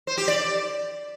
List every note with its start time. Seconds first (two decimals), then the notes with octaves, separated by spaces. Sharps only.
0.07 C5
0.17 G4
0.28 D5